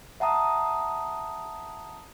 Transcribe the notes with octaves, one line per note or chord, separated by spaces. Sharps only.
E5 F#5 A5 A#5 D#6